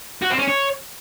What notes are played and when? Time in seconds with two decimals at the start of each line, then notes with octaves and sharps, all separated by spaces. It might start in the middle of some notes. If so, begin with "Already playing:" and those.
0.22 F#4
0.31 C4
0.39 C#4
0.47 C#5